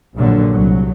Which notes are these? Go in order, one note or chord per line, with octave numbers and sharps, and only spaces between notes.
A#1 G2 A#2 D3 F#3
C2 F#3